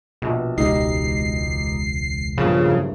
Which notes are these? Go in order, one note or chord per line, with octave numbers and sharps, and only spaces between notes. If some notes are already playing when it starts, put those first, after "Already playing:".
A#1 B2
E1 C#2 D#4 G4 D#5 C7
B1 G2 A#2 C#3 F3
F#1